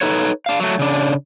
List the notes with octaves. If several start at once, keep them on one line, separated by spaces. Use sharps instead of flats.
D#4 A4 B4 C#5
D4 F5
F#3 A3
C#3 D4